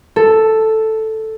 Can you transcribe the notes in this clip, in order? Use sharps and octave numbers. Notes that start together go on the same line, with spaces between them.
A4